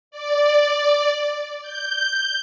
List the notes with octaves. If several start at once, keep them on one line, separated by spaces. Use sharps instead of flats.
D5
G6